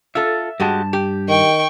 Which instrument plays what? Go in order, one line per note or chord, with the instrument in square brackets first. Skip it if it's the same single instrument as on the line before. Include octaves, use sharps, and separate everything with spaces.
[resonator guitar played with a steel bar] F4 A4 [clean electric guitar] E5
[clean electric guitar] G2 A5 [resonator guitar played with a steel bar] G#3 F#4 G4
[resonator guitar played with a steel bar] G4
[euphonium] D#3 [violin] G5 C#6